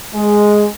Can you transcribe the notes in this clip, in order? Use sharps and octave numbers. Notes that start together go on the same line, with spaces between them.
G#3